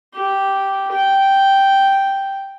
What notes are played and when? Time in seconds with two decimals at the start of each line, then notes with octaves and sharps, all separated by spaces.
0.14 G4
0.93 G5